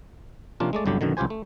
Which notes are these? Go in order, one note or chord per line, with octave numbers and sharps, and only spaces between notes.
C3 F3 A#3 C#4 D4 F4
G#3 A3 D5
G1 C2 D3 F#3 G4
F#2 B2 D3 D#3
C#2 F#3 F4 G4 C5 G#5
A3